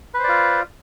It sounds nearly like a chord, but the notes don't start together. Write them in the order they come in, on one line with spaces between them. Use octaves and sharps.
B4 C5 D5 F4